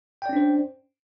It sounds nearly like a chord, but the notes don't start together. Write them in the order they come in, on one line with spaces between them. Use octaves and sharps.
G5 D5 C#4 D4 C5